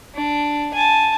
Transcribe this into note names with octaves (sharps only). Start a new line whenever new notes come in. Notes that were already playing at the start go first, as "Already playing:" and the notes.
D4
G#5 A5